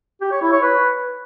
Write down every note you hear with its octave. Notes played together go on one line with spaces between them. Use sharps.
G4
C#5
E4
C#5
B4